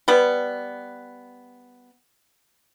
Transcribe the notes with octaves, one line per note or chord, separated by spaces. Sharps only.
G3 B3